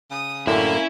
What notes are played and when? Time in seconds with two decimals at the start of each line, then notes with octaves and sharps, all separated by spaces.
0.11 C#3 D#6
0.47 F#2 A2 D3 A#3 C#4 E4 G#5